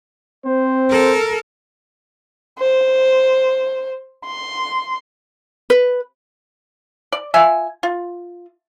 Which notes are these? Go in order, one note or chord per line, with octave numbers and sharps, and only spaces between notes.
C4 C5
A4 A#4
C5
C6
B4
D5
F4 E5 G#5
F4